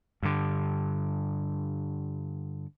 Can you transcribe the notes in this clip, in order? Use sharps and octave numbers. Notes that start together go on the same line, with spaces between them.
G2 D3